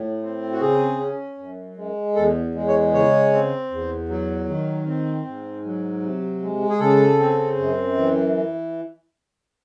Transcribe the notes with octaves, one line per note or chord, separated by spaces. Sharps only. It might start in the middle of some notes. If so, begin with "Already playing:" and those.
Already playing: A2
C4
F#4
C#3 G#4
C#4
F#2
G#3
E2 A4
G#3
C#5
C#3 C#5
C4
E2
F#3
D#3
C4
G#2
F#3
C3
G#3
G#4
C#3 A4
C4
F#2
E3